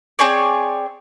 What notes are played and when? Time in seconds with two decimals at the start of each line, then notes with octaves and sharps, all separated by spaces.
0.19 C4 G#4 C#5 D5